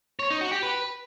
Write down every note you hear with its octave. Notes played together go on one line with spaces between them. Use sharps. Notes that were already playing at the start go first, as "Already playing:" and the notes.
C#5
D#4
F#4
G4
B4